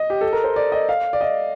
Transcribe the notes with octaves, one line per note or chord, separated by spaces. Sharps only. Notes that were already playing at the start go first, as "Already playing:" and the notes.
Already playing: D#5
G4
A4
A#4
C5
D5
D#5
F5
D5
D#5